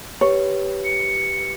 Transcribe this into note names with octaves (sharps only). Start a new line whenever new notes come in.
G4 B4 C#5
C#7